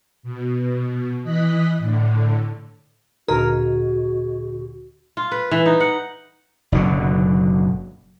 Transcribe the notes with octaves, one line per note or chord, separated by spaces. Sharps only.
B2
E3 D#5 F#6 B6
A2 D3
D2 A#2 D3 F#4 G#4 A#4 D#5
F4
B4
E3
D#4
F#5
F#1 B2 D3 F#3